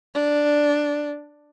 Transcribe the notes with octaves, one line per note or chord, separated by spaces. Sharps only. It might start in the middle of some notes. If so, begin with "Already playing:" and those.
D4